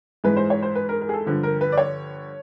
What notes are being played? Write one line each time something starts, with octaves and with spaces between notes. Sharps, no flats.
G#2 E3 G#3 B4
C5
C#5
C5
B4
A#4
A#4
G#4
A4
G2 D3 F3
A#4
B4
D5
C#5